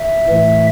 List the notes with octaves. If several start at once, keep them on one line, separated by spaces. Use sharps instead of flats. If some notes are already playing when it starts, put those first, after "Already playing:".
Already playing: E5
A2 E3 A3